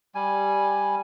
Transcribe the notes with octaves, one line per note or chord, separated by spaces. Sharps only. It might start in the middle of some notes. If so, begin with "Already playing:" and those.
G3 G#5